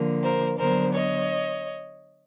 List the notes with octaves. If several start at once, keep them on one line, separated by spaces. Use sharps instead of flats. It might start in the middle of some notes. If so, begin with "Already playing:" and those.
Already playing: D3 F3 A#3
A#4 C5
D3 F#3 B3 A#4 C5
C#5 D#5